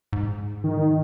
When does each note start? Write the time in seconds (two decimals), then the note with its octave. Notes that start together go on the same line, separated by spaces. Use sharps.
0.13 G#2
0.64 D#3